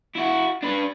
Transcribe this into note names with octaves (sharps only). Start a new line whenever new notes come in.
E4 F#4
D4 B4